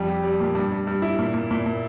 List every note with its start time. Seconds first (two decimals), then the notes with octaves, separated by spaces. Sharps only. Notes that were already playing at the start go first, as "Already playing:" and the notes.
Already playing: F2 G3
0.09 G4
0.23 G3
0.40 A#2
0.55 G2
0.72 G2
0.87 G2
1.02 E4
1.19 A#2
1.34 A#2
1.51 A#2
1.66 A#2